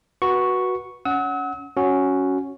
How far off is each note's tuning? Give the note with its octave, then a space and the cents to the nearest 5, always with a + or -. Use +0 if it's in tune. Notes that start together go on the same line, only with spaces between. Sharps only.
F#4 +0 B4 -20 C#6 +0
C#4 +20 F#5 +0 E6 -45
C#4 +0 F#4 +0